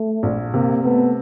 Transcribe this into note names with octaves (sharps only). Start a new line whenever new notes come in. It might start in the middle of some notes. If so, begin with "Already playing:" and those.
Already playing: A3
A#1
C3 A#3
A3 B3